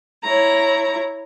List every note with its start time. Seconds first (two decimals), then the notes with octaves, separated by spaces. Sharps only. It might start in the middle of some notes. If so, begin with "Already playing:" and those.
0.23 E4 C#5 A#5